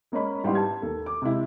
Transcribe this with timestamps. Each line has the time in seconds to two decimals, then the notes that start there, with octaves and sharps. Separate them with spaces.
0.12 G#3 A#3 C#4 D#5 B5
0.44 G#2 G3 B3 E4 F#5 C6
0.55 A5 G#6
0.82 D#2 A4
1.06 D6
1.22 C3 G#3 E4